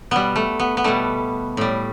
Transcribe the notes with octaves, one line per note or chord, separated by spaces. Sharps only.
B2 G3 B3
A3
B3
B3
B2 G3 A3
A2 G3